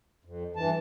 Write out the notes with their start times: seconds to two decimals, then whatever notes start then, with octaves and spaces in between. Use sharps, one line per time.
0.25 F2
0.56 G2 E3 A5